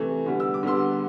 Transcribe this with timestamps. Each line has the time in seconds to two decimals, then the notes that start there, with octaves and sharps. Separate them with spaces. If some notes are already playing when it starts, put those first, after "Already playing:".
Already playing: C3 E3 A3
0.26 D3 G3 B3
0.40 E6
0.54 D6
0.63 D3 G3 B3 D4 C6 E6